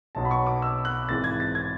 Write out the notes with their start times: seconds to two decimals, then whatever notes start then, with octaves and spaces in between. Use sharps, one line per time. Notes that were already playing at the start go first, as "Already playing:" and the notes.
0.15 B1 B2 F#3 B3 A5
0.25 B5
0.31 C#6
0.46 D6
0.62 E6
0.85 F#6
1.09 G#1 G#2 E3 G#3 A6
1.24 G#6
1.40 A6
1.55 G#6